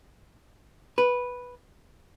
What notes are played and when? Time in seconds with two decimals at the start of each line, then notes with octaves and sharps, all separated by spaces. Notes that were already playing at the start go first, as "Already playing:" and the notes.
0.98 B4